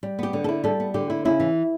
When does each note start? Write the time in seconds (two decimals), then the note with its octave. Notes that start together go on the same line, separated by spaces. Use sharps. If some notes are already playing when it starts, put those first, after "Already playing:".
0.03 G3
0.19 B3 G4
0.33 D3
0.44 A4
0.49 E4
0.64 G3 A4
0.80 B3
0.94 D3 G4
1.10 E4
1.25 C#3 E4
1.40 E3